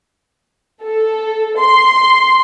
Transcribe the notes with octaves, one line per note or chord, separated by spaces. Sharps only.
A4
C6